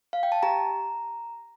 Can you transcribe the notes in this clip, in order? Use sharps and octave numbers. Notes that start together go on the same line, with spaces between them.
F5
G5
A5
G4 A#5